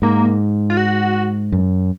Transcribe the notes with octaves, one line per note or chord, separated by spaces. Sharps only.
G#2 A#3
F4
F#4
F#2